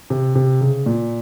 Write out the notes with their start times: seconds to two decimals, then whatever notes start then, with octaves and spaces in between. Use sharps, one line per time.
0.10 C3
0.35 C3
0.61 C#3
0.86 A#2